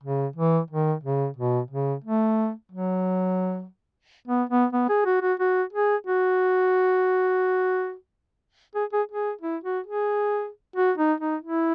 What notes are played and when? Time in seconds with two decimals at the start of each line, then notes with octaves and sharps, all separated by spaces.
0.03 C#3
0.36 E3
0.70 D#3
1.03 C#3
1.37 B2
1.71 C#3
2.04 A3
2.71 F#3
4.28 B3
4.50 B3
4.72 B3
4.89 G#4
5.06 F#4
5.22 F#4
5.39 F#4
5.73 G#4
6.07 F#4
8.75 G#4
8.93 G#4
9.11 G#4
9.41 E4
9.64 F#4
9.86 G#4
10.76 F#4
10.98 D#4
11.20 D#4
11.42 E4